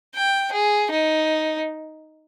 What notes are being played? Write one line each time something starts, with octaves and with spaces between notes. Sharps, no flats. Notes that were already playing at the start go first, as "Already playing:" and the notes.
G5
G#4
D#4